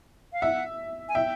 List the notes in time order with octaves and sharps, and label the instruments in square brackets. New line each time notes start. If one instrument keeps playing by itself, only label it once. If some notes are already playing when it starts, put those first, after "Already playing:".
[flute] F5
[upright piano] E5 [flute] F#5
[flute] G#5
[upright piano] E5 [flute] G5